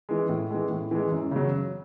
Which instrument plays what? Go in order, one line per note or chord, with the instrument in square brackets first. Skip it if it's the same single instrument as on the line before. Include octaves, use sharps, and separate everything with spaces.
[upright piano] E3 G#3
A2
E3 G#3
A2
E3 G#3
F#2
C#3 F#3